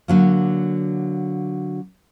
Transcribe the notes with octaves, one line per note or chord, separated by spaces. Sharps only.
D3 F#3 A#3